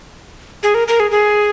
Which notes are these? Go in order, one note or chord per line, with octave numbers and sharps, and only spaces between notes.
G#4
A#4
A#4
G#4
G#4